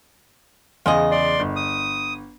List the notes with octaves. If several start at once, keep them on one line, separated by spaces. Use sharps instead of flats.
E2 C#3 F4 G#4 D#5
D5 C6
G1
D#6